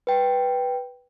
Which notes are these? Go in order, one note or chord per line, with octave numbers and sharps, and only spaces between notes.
B4 G5